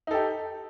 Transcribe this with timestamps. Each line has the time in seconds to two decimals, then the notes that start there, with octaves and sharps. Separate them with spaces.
0.07 D#4
0.11 A4
0.14 G4